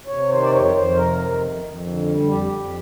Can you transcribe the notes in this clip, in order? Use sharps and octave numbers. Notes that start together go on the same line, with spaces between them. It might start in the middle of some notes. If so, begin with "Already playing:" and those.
C3 C#5
D#3 C5
D5
F2 C#5
C#5
F2 C5
C3 A#4
D#3
F2
F2
D3
G3
F2 G4
F2